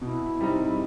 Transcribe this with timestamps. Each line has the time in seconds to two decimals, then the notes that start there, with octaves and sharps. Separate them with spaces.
0.02 B2 E4
0.41 G3 C4 D#4